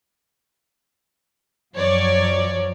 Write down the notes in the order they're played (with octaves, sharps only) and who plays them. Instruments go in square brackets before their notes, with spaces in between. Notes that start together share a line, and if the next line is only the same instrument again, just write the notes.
[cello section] F#2 F3 [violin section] C#5 D5